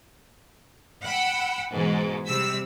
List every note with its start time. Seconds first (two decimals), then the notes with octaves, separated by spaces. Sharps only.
1.03 F#5 G5 B5 E6
1.71 G#2 B2 E3 G#3
2.26 C3 G3 C4 E6 B6